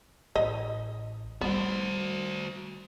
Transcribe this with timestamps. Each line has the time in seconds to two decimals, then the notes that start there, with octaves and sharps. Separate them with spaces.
0.36 A1 D#5
1.41 G3 B3 F#4 C5